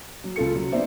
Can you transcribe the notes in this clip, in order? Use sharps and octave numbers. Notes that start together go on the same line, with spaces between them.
F#3
C#2 F4 A4 C#7
F#3
B3 C4 D#4 C5 D5 E5